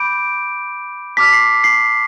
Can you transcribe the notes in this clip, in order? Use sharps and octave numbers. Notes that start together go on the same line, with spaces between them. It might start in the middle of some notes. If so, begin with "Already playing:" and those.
Already playing: B5 D6 G6 D7
A5 D6 F6 B6
C7
C7